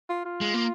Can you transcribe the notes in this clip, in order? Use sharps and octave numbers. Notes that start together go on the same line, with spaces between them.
F4
F4
G#3
A#3